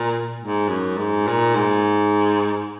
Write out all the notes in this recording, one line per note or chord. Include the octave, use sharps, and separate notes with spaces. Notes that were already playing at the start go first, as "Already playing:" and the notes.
Already playing: A#2
G#2
F#2
G#2
A#2
G#2